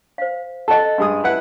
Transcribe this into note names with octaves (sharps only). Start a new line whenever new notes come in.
C5 F5
A4 D#5 F#5 A5
G2 G#3 D#6
E4 B4 F#5